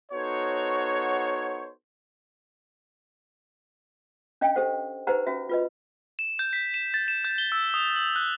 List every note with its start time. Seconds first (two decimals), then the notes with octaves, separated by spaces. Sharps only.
0.12 B3 D#4 F#4 A4 C5 C#5
4.41 C#4 D4 D#5 F5 G5
4.55 G4 A4 C5 F#5
5.07 D#4 G4 B4 C5 F#5 A#5
5.27 C#4 F#4 E5
5.49 F4 B4 D#5
6.19 E7
6.39 G6
6.53 B6
6.74 E7
6.94 A6
7.08 E7
7.24 G6
7.38 G7
7.52 E6
7.74 D#6
7.96 F#7
8.16 F#6